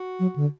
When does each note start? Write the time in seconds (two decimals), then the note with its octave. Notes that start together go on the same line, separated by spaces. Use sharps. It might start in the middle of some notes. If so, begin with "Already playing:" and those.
Already playing: F#4
0.20 F#3
0.36 D3